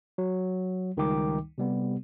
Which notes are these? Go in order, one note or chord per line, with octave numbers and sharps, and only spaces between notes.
F#3
C#2 D#3 G3 D#4 G5 D6
C3 G3 B3